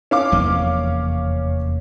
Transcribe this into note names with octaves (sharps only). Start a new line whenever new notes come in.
C#4 F5 D6
F1 E2 A#3